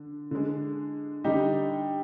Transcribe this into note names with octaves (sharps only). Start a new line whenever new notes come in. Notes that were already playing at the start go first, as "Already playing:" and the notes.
Already playing: D3
D3 G#3
D3 G3 D#4 G4